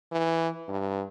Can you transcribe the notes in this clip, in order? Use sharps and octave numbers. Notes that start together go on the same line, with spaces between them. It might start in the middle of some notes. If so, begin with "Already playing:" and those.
E3
G2